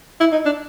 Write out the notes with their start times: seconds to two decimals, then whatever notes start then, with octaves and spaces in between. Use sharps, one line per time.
0.20 E4
0.32 D#4
0.46 D4